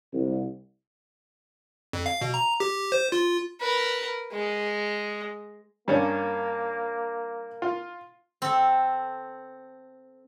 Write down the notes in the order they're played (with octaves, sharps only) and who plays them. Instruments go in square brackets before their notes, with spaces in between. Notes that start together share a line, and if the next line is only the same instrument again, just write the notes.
[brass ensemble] C2
[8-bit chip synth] F2
F5
B2
A#5
G4
C5
F4
[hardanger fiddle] A#4 B4
G#3
[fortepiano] G2 C#4 C#5 [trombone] A#3
[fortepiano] F4
[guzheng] C4 A4